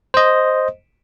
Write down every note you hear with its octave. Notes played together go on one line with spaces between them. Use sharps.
C5 D#5